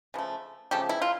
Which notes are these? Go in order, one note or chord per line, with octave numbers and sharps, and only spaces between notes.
C#3 F3 A3
C#3 F3 A3 G4
E4
F4